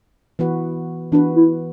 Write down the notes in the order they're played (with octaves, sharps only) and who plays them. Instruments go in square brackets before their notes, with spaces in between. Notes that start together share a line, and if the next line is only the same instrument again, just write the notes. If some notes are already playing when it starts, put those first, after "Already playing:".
[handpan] E3 B3 F#4 B4
[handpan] E3 B3 F#4 B4 [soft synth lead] D4
[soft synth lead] E4